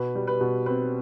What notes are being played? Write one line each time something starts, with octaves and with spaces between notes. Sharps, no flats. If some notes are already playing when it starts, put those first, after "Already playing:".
Already playing: B2 B4
G3
B4
B2
C4 B4